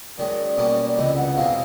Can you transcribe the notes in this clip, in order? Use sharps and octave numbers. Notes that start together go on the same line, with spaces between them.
F#2 D#3 G#3 D5
B2 G3 A#3 C#4
C#2 C3 E3 D#5
F#5
E2 B2 G#3 C4 F5